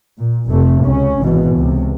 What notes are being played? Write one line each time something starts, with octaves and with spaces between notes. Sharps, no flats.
A#2
F1 C3 A3
C#2 C#4
G#1 B2 E3
C#2 C3